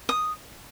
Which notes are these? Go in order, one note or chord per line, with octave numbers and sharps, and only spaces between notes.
D#6